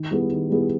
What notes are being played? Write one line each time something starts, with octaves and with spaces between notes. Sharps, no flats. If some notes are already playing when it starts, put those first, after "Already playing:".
Already playing: D#3
G3 B3 E4 G#4
D#3
G3 B3 E4 G#4